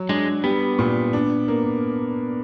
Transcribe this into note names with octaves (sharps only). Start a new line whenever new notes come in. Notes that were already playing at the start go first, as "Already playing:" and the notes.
Already playing: F#3
G#3 D4
G3 B3
A#2
D4
A#3